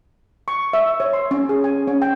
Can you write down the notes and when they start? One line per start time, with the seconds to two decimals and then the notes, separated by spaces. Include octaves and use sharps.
0.48 C#6
0.73 E5
1.00 C#5
1.13 C6
1.31 C#4
1.49 G#4
1.64 G#5
1.87 C#4
2.02 G5